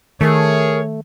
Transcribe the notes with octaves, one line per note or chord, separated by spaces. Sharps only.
D#3 A3 G#4 A#4 C#5